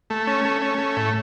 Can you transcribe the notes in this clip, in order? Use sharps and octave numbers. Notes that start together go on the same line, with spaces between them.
A3
C#4
A3
C#4
A3
A2